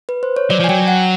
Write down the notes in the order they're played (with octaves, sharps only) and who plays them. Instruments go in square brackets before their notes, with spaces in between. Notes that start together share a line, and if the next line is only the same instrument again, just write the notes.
[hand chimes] B4
C5
C#5
[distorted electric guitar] F#3 [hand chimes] D5
[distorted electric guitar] F3
[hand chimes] G#5
[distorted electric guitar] F#3 [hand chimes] G5
[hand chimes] F#5